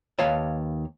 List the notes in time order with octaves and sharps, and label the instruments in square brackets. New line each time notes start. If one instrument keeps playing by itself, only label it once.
[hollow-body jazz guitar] D#2 B4 C#5 F5 A5